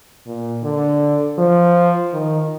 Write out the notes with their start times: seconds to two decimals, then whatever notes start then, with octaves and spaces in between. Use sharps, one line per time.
0.27 A#2
0.63 D3
1.38 F3
2.13 D#3